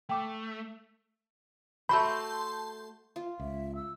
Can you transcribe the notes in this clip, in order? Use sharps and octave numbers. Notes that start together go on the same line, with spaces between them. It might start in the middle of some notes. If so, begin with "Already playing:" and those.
A3 G5 D6
A3 F#4 C5 A5 B5 C6 G6
F4
C#2 E5
E6